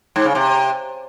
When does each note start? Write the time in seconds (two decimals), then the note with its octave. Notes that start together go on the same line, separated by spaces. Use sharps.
0.16 G#2
0.25 C#3
0.35 C3